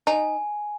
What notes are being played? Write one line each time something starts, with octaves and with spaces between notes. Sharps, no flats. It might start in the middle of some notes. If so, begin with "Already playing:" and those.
D#4 G#5